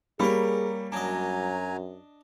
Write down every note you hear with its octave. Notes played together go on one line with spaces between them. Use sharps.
G3 A#3 C#4 G#4 A#4 B5
F#2 F#3 D4 D#5 G#5 A#5